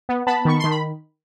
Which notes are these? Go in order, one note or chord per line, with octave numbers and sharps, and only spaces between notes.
B3
B3 A5 B5
D#3 C#6
D#3 C6
B5